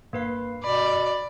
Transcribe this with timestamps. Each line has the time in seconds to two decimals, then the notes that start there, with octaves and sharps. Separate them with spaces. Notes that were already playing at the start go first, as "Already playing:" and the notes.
0.13 G2 A#3 B4 F5
0.64 B2 D5 B5